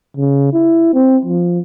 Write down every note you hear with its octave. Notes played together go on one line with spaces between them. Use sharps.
C#3
E4
C4
F3